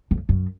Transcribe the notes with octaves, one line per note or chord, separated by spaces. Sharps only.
F2
F#2